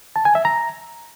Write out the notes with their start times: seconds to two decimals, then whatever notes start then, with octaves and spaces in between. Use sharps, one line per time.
0.16 A5
0.25 G#5
0.35 E5
0.45 A#5